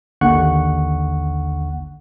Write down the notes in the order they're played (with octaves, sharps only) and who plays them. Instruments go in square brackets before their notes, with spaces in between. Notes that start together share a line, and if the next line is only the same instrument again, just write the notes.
[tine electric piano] A1 D#2 D3 F#5 C#6 F#6